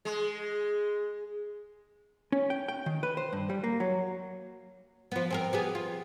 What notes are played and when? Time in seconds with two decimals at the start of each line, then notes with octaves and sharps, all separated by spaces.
0.05 G#3
2.32 C#4
2.50 G5
2.68 G5
2.86 D#3
3.03 B4
3.17 C5
3.33 G2
3.50 G3
3.64 A#3
3.80 F#3
5.12 F3 B3
5.30 C4 G#4 A#4
5.53 B3 G4 G#4
5.75 F4